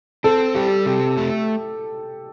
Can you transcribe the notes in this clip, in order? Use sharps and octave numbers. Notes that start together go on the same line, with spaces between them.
C4 A4
G3 G4
C3 G4
A3